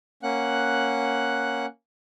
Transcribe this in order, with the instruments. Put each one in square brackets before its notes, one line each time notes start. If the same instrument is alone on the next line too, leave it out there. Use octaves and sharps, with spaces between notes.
[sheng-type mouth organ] A#3 C#4 F#5 F#6